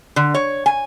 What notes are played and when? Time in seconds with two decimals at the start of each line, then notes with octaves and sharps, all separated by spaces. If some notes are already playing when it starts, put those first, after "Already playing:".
0.16 D3
0.34 C#5
0.66 G#5